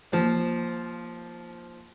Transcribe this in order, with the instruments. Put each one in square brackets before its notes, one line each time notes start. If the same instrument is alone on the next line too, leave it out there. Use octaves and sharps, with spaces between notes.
[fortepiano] D#2 F3